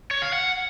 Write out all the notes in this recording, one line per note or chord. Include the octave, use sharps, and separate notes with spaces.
C#5
F5
F#5